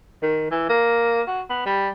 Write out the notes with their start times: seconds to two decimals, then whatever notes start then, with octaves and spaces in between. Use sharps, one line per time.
0.22 D#3
0.51 E3
0.69 A#3
1.27 F#4
1.50 B3
1.66 G3